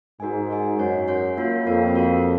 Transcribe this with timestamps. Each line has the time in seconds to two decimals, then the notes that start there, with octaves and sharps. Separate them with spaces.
0.20 G#2 F#4 A#4 D#5 G#5
0.50 F#4 A#4 D#5 G#5
0.78 F#2 F#4 C#5 F#5
1.08 F#4 C#5 F#5
1.37 A#3 F4 A#4 C#5 F5
1.66 F2 A#3 F4 A#4 C#5 F5
1.96 F#4 A#4 F5